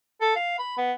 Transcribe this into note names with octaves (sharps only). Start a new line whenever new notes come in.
A4
F5
B5
B3